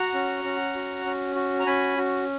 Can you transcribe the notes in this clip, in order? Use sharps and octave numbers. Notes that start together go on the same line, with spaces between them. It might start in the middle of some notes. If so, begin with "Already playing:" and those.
Already playing: F#4 F#5 A#5
C#4
C#4
F#4
C#4
F#4
A#5
C#4 G#5 B5
F#4